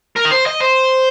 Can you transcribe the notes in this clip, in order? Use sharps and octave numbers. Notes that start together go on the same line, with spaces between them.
A#4
D#5
C5
D#5
C5